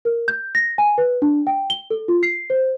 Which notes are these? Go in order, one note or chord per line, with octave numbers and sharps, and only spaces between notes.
A#4
G6
A#6
G#5
B4
D4
G5
G7
A4
F4
C7
C5